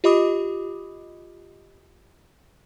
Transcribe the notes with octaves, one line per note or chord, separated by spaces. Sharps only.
F4 G4 D#5 B5 D6 D#6